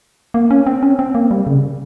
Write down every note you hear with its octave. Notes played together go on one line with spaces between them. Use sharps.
A#3
C#4
C4
C#4
C4
A#3
G3
C#3